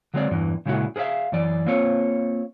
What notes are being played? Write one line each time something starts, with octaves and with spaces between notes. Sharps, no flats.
D3 F#3 G#3 C4 D4 D5
E2 G2 E3
A#2 C#3 G#3 A3 E4 F#4
G#4 A#4 C5 E5 F5
F#2 E3 D5
A#3 C4 F4 C#5